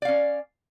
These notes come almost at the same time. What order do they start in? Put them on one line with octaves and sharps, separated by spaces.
D5 F5 C#4